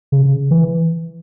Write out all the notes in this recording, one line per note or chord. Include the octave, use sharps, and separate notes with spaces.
C#3
E3